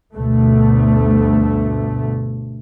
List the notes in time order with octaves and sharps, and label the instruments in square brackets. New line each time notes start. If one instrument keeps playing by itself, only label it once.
[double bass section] D2 G2 B2 A3